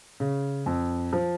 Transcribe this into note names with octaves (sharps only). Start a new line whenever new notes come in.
C#3
F2
F3